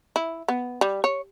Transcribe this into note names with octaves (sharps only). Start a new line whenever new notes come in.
E4
B3
G3
C#5